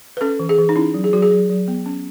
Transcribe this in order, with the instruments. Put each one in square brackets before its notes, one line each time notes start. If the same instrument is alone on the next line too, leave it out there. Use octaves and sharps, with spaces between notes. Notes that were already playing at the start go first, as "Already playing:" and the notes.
[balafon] B4
C#4 A4
E3
G#4
E3
D#4
C#4 E4
F#3
G#4
F#3 F#4
G#4
F#3
F#3
B3
C#4